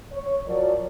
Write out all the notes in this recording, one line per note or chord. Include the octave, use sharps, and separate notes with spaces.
C#5
F3 F#3 F#4 A#4 C#5 D5